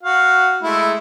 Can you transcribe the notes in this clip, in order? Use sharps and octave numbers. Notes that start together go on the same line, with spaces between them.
F#4 F5
G#3 A3 E4